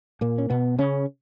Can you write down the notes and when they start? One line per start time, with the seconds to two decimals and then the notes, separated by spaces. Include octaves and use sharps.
0.21 A#2 A#3
0.38 C#4
0.50 B2 B3
0.79 C#3 C#4